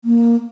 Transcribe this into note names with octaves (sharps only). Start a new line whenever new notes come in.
A#3